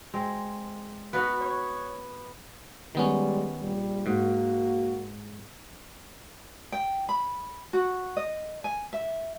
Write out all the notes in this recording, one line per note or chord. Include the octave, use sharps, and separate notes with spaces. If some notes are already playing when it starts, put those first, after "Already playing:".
G#3 C4
B3 D#4 F#4 B4
C#5
D#3 G3 G#3 B3 C#4
A#1 G3
G#2 A#3 F#4
G5
B5
F#4
D#5
G#5
E5